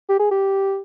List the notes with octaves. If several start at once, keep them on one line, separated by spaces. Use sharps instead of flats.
G4
G#4
G4